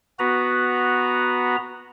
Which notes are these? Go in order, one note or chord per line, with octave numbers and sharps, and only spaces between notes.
B3 F#4 B4 A#5